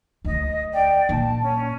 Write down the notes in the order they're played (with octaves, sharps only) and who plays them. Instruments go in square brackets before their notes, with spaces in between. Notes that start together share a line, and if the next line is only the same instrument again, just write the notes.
[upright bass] D2 [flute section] D#5
[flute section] D5 G5
[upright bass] A#2 [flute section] A5
[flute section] C#4